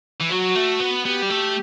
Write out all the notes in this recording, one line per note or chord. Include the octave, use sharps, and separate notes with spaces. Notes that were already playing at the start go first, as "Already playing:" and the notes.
E3
F#3 F#4
A3
B3
B3 G4
G3
A3